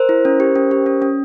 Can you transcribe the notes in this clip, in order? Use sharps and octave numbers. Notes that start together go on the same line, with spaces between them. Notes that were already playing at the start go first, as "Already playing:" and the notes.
Already playing: A#4 C5
E4
C#4
G4
C#4
G4
C#4
C#4